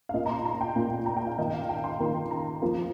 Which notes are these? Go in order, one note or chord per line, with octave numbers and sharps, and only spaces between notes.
F5
A#2 A#3 F4 D#5
A#5
C6
A#5
G5
A#2 A#3 F4
A#5
G5
F5
D#3 A#3 F4 D#5
F5
G5
C6
D#3 A#3 F4 A#5
A#5
F3 A#3 F4